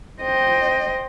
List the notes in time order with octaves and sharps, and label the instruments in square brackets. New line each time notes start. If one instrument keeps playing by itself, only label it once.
[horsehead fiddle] C5 G5 [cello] D#5